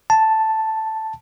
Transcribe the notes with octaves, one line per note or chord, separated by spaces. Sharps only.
A5